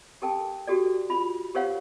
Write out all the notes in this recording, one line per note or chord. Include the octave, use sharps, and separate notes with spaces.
G4 A4 A#4 G5 A5
F#4 G4 A4 D5
F4 B5
G4 A#4 C5 C#5 F5 F#5